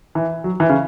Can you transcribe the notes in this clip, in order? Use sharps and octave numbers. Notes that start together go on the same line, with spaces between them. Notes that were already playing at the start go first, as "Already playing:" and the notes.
E3
F#3
E3
C#3